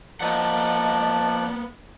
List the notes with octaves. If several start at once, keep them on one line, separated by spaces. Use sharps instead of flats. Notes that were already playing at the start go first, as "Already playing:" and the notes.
F3 A#3 B3 D5 D#5 F#5 A5 F#6